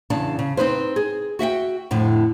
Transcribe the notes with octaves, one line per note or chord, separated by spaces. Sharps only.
E2 C#3 D4 D5 A5
C#3
C4 D#4 B4 C5
G#4
F#4 E5 F#5 G5
F2 A2 D3